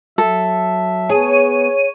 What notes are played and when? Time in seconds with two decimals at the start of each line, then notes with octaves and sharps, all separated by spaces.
0.18 F#3 A4 E5
1.09 B3 G#4 C#5 D#7